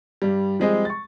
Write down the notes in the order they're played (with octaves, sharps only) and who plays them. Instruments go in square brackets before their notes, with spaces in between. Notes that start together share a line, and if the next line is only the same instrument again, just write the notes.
[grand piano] G2 G3
F3 G3 G#3 C4 G#4 D#5
C#6 A6